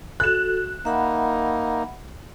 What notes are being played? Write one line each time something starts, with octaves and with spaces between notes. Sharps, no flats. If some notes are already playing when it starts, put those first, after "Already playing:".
F#4 A4 F#6 E7
A#3 D#4 E5 F#5 B5